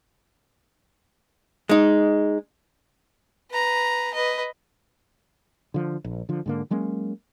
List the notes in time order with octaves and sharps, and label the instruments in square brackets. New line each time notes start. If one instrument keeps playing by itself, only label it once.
[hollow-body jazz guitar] G#3 D#4
[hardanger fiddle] B4 A#5
B4 D#5
[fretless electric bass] D3 F3
A#1
D3 F3
G#2 D3 A#3
F#3 G#3 A#3 C#4